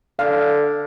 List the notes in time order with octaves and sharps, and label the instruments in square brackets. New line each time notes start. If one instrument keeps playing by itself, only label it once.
[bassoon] D3 [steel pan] F5